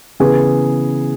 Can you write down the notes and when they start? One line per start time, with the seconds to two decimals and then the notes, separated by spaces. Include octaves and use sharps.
0.20 C#3 E3 B3 G#4